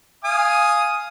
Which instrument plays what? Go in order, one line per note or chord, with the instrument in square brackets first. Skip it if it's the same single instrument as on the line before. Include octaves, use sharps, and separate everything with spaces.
[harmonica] F5 G#5 D#6